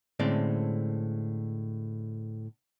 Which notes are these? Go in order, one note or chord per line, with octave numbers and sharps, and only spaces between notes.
A2 D3 G#3 C4 C#4 D5